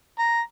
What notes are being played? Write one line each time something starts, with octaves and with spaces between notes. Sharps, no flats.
A#5